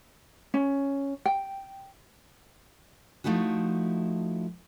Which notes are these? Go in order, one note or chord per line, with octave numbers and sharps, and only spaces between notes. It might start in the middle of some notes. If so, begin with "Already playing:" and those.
C#4
G5
F3 A3 D#4 E4 F#4